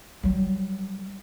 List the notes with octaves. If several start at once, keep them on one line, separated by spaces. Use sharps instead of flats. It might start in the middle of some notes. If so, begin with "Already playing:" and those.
F#3 G3